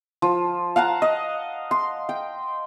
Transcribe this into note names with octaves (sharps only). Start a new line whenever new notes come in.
F3
F5 F#5 A5 A#5
D#5
C6
G5